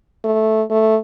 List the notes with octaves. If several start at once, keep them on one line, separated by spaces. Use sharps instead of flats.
A3
A3